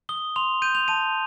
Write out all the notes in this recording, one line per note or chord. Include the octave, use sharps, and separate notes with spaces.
D#6 G7
C6 F7
G6 D#7
F7
A5 D#7